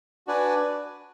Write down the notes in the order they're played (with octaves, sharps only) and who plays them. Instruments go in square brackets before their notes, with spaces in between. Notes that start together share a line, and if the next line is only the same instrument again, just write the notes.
[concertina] D4 F#4 B4 D5 G#5